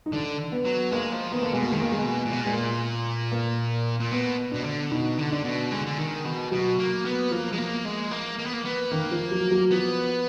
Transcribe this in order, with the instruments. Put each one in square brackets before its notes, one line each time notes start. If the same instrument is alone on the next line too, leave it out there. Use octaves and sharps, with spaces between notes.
[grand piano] D#4
[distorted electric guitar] D3 [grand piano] D4
[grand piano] B3
[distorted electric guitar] F#3
[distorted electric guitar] G#3 [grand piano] A#3
[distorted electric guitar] F3
[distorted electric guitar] D#3 [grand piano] B3
[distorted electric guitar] D3 [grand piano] A#3
[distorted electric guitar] B2 [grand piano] G#3
[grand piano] A#3
[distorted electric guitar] D#3 [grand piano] G#3
[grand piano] A#3
G#3
[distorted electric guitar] B2
A#2
B2
A#2
[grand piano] G#3
A#3
A#3
[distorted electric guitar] A#2
[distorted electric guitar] B2 [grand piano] B3
[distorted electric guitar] B2 [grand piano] D4
[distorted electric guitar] D3
[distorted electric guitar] B2 [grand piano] D#4
[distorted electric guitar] D3
[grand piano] D4
[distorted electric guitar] B2
[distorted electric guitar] D3 [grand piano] G#3
[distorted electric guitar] D3
D#3
B2
[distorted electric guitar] B2 [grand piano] F#3
[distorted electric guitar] A#3
B3
[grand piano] F3 [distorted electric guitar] A#3
[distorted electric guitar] G#3
A#3
G#3
A#3
A#3
B3
A#3
B3
[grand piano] D#3 [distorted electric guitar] A#3
[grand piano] F3
F#3
F#3
[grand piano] F3 [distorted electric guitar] B3